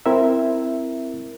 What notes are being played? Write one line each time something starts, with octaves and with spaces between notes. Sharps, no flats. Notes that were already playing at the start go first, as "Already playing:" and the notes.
C4 E4 A#4 E5